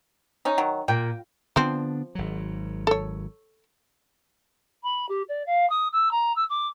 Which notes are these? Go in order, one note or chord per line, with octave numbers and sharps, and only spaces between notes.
C#4 D#4
D#3 F#3
A#2 G5
D3 F3 B3 C4 D4
G#1 F#3
A4 C#5
B5
G4
D5
F5
D#6
E6
A#5
E6
D6